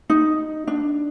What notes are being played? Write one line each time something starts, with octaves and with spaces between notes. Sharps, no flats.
D#4
D4